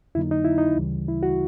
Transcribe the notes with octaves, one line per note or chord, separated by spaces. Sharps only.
F2 D3 F#3 A#3 D#4 E4
D#4
E4
D#4
D2 C#3 E3 G3
E4
F#4